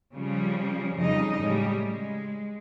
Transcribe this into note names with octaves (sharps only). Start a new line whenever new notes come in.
C#3 F3 G3
F2 C#3 F3 G3 D#4 D#5
A2 C#3 G3 G#3
G#3